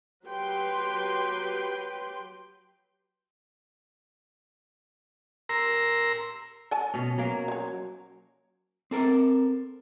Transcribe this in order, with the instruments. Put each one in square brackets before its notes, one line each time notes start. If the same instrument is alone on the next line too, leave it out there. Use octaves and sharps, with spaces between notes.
[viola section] F#3 G4 B4 G5 C6
[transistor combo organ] A#4 A#5 C6 E6
[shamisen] A4 G#5 A5
[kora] B2 C#4
F#3 A#3
[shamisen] C5 C#5
[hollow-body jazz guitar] C4 A4 A#4